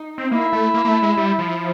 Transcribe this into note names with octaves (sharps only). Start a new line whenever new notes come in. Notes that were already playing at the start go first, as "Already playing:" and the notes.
Already playing: D#4
C4
A#3 E4
A3
A#3
A#3
A3
G#3
G3
F3